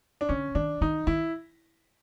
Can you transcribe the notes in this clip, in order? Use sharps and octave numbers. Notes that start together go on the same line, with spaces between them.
D4
D3 C#4
D#3 D4
D#3 D#4
D#3 E4